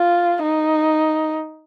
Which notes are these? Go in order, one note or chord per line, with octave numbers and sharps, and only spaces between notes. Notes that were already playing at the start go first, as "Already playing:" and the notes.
Already playing: F4
D#4